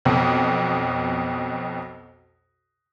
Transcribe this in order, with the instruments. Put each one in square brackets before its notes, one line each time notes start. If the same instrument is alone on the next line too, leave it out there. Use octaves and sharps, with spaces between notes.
[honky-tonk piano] B1 F2 B2